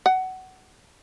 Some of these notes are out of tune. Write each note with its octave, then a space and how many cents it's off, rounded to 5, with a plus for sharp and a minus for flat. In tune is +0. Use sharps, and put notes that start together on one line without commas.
F#5 +20